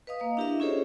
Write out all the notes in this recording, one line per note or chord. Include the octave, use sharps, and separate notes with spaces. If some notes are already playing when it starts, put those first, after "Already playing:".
B4 D#5 F5 D#6
A#3 F5
D4 E4 G4 A#4 D#5 E5
C#4 F4 G#4 A4 C5 C#5